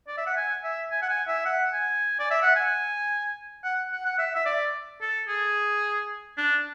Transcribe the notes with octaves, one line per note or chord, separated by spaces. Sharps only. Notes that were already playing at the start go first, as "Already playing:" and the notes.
D5
E5
F#5
G#5
E5
G#5
F#5
G#5
E5
F#5
G#5
D5
E5
F#5
G#5
F#5
F#5
F#5
E5
E5
D5
A4
G#4
D4